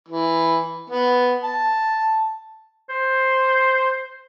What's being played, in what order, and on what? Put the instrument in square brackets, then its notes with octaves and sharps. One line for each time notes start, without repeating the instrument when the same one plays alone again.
[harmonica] E3
B3
A5
[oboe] C5